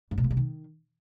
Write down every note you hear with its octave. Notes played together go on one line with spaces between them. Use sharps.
F#2
B2
A#3
C3
D#3